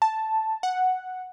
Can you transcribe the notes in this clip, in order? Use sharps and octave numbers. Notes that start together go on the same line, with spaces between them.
A5
F#5